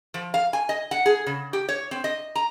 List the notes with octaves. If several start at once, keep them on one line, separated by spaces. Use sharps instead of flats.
F3
F5
G#5
D#5
F#5
G#4
C#3
G4
C#5
C4
D#5
A#5